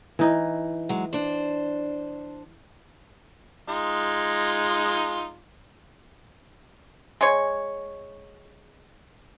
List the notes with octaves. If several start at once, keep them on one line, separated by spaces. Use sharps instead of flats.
E3 D#4
F#3 G#3
D4 C5
G#3 D#4 F4
G#3 C#5